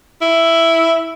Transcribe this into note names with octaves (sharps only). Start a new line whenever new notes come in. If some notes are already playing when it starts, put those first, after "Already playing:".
E4